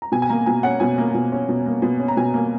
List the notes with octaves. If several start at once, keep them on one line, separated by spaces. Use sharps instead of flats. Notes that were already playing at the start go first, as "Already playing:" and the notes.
A#5
B2 G#5
G#5
A#3 A#5
B2 G#5
C#4 F#5
B2 G#5
A#3
B2
C#4
B2
A#3
B2
C#4
A#5
B2 G#5
A#3